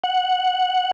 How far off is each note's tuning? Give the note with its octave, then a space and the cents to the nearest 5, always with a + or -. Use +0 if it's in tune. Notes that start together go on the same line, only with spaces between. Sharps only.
F#5 -5